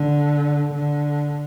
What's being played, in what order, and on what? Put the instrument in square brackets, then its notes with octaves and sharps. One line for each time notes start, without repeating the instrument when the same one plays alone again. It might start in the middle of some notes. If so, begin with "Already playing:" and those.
Already playing: [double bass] D3
D3